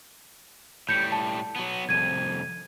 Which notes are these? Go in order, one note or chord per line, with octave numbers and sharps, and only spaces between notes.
A2 G3 G6 C#7
A5
F#3 B3
C2 F2 G#6 D#7